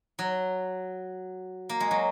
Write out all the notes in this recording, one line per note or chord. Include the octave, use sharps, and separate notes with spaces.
F#3
A#3
G#3
F#3